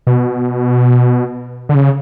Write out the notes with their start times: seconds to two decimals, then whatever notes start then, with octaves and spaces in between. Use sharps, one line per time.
0.07 B2
1.69 D3
1.75 C#3